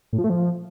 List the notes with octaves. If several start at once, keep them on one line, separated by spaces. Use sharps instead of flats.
A2
F3
A3
F3